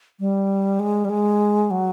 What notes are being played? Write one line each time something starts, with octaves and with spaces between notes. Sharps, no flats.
G3
G#3
G3
G#3
F#3